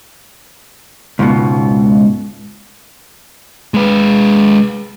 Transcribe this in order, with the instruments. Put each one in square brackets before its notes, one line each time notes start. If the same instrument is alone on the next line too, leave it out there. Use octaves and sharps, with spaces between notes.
[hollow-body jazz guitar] C#2 G#2 B2
[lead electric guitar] G#3 B4